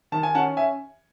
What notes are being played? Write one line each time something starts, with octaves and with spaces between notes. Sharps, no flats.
D#3 A5
G#5
C#4 F#5 A5
E5 G#5